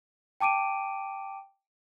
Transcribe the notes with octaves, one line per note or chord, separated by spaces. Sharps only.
G5 A5 D6 D7 D#7